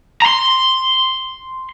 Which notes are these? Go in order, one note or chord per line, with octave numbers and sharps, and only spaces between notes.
A#5 C6